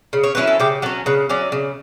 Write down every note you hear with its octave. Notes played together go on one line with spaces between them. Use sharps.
C#3
C#5
F#3 C#4 E4 B4
A4
C#3 G4
F#3 C#4 A4
C#3 B4
F#3 C#4 D5
C#3